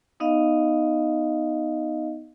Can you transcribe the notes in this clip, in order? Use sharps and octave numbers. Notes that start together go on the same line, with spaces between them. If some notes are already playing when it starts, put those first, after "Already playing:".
B3 D#4 D#5 F5